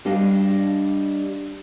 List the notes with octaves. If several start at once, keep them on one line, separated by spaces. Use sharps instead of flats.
G3 D4 D#5 F5